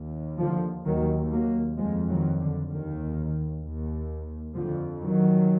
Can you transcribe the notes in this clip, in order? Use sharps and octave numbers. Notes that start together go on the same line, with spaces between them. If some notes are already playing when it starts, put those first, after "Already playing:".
Already playing: D#2
D3 F3
D#2 D#3 F#3
F#3 A#3
F2 F3 G#3
D#3 F#3
D3
D#2 D#3
D#2
F2 D3 F3
D#3 F#3